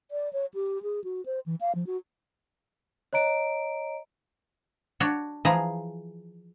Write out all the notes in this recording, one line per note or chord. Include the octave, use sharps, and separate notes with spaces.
D5
C#5
G4
G#4
F#4
C5
E3
F5
F3
F#4
C#5 D#5 A#5 D7
D4 F#4 C#5
E3 F3 G#4 A#5